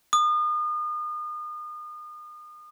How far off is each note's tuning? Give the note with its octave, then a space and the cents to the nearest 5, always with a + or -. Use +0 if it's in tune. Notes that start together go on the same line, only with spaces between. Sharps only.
D#6 -35